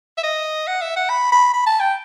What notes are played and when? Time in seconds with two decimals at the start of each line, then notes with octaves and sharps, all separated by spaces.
0.18 E5
0.23 D#5
0.67 F#5
0.82 E5
0.96 F#5
1.10 B5
1.32 B5
1.54 B5
1.67 A5
1.80 G5